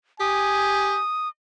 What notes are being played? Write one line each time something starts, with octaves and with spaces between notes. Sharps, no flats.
G4 G#5 D#6